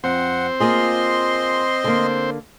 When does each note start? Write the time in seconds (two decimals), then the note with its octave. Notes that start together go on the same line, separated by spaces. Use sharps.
0.04 F2 C4 C5 F#5
0.60 A#3 F4 G#4 D#5 C6
1.84 D3 A#3